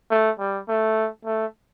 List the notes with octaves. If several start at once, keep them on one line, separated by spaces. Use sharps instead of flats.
A3
G3
A3
A3